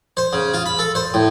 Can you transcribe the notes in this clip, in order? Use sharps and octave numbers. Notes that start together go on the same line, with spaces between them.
C5
C#3
F4
B5
A4
C5
A2